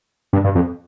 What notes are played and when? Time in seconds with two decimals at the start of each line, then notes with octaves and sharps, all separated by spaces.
0.33 G2
0.44 G2
0.55 F2